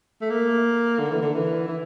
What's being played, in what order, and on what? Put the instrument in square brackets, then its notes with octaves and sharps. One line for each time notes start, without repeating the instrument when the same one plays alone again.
[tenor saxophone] A3
A#3
D3
E3
D3
E3
E3